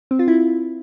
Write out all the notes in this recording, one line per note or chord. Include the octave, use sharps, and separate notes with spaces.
C4
F4
E4